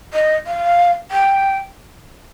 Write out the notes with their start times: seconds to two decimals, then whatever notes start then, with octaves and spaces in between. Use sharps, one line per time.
0.14 D#5
0.47 F5
1.11 G5